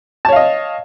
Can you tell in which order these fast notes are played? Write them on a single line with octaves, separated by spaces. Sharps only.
A5 C#5 F5 D#5